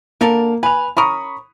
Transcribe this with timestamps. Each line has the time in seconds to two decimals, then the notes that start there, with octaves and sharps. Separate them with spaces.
0.21 D3 A#3 A4 A#4
0.63 B4 G#5 F7
0.97 C#4 A#4 B5 C#6 D#6